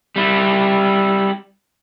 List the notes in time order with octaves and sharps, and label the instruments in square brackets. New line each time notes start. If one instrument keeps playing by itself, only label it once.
[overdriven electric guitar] G3 E4